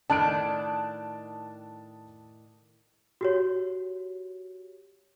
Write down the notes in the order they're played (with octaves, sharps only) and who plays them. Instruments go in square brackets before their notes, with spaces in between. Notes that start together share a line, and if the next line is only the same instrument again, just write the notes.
[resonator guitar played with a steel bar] A2 D#3 D4 [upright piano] A5 F#6 D7
[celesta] F#4 G4 C#5